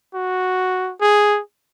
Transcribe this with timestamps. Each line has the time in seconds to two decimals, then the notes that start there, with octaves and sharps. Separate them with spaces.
0.14 F#4
1.01 G#4